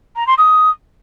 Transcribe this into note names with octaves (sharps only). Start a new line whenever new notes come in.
A#5
C6
D#6